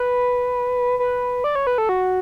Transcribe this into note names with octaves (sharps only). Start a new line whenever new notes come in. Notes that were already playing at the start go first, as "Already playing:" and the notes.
Already playing: B4
B4
D5
C#5
B4
A4
F#4